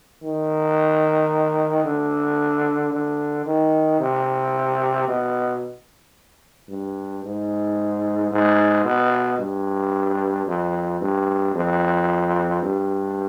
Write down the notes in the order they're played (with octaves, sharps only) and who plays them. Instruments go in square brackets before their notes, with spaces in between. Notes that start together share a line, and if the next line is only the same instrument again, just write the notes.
[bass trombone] D#3
D3
D3
D#3
C3
B2
G2
G#2
G#2
B2
G2
F2
G2
F2
G2